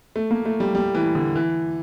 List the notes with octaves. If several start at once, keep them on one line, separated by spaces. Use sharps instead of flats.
A3
A#3
A3
G3
G3
E3
D3
E3